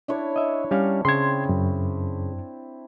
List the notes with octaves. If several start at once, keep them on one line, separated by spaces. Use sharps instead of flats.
D4 E4 C#5
D#5 E5
G3 C#4 F5
C#3 C4 E4 C6 G#6
F#2